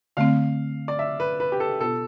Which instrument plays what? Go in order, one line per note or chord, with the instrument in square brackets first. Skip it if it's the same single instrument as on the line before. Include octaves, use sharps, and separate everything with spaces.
[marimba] D3 A3 C4 [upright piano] F5
[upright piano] D5
E5
B4
B4
G4
A4
[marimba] B2 B3 F4 [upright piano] A4